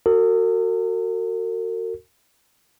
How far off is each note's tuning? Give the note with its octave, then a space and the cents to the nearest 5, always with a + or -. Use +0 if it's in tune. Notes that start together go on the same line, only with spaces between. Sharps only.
F#4 +0 A#4 -45